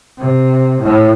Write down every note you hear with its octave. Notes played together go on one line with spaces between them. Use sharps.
C3
A2